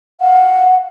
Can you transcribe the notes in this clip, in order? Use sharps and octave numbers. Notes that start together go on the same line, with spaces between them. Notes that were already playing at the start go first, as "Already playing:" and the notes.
F5 F#5